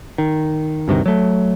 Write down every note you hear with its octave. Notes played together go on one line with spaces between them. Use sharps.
D#3
D2 G2 C3 D#3
F#3 A3